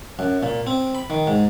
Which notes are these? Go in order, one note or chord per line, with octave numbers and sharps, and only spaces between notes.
F#2
A#2
C4
B5
D#3
G#2